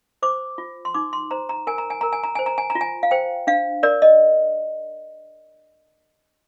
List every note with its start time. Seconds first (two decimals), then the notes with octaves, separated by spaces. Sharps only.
0.22 C5 D6
0.58 F4
0.85 C6
0.94 D#4 D6
1.13 C6
1.31 C5 A#5
1.49 A#5
1.67 A#4 G#5
1.78 A#5
1.90 G#5
2.01 A#4 A#5
2.13 G#5
2.24 A#5
2.35 C5 G#5
2.46 A#5
2.58 G#5
2.70 A#5
2.75 F4
2.81 G#5
3.03 F5
3.11 C5 G5
3.47 D4 F5
3.83 A#4 D5
4.02 D#5